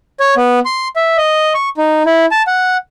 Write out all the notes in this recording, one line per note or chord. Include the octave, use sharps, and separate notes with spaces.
C#5
B3
C6
E5
D#5
C#6
D#4
E4
A5
F#5